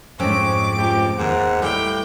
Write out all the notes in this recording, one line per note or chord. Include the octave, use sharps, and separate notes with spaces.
F2 G#2 C4 C#4 C#5 D6
C#2 G4
D#2 G#2 F#5
A2 G3 G4 G5